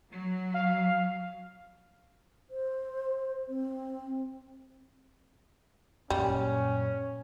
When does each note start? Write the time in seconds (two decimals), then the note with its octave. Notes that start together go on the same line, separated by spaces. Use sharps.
0.11 F#3
0.54 F5
2.51 C5
3.49 C4
6.10 F#2 A#2 G3 C#4